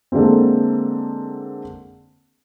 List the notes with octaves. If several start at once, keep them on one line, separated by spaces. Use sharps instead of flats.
D3 G#3 A#3 C4